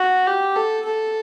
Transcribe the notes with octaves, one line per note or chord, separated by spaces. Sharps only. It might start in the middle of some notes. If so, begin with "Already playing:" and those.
Already playing: F#4
G4
A4
A4